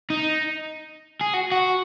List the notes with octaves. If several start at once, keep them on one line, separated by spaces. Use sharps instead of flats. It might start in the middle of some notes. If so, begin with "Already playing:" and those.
D#4
G#4
F#4
F#4